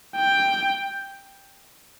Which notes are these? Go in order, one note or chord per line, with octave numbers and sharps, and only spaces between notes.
G5